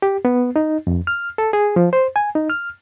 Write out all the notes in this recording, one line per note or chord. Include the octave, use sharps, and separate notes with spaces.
G4
B3
D#4
F2
F6
A4
G#4
F3
C5
G#5
D#4
F6